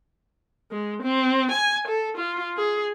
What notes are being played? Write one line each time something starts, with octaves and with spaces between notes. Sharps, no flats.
G#3
C4
G#5
A4
F4
G#4